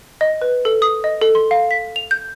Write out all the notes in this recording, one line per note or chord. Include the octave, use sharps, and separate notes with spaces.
D#5
B4
A4
D#6
D#5
A4
C6
F5
B6
F7
G6